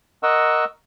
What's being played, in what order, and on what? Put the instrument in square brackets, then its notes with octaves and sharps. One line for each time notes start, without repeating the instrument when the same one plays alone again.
[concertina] A#4 D#5 F#5 C#6 E6